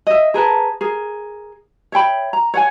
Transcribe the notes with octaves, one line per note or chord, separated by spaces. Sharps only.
D#5 E5
G#4 A#4 B4 A5
G#4 A#4
C#5 E5 G5 B5
A#5
C#5 F#5 G#5